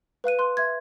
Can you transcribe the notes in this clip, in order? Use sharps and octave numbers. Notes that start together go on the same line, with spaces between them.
B4 F5 F#6 D#7
C6 F#6
E5 C6 G#6